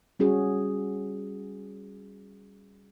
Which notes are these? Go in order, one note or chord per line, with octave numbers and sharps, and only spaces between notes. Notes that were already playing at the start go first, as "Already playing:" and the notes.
G3 C#4 F#4 G#4